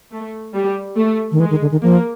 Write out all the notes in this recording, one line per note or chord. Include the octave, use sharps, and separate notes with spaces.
A3
G3
A3
D#3
E3 G#3
D#3
D3
D#3
F3 A#3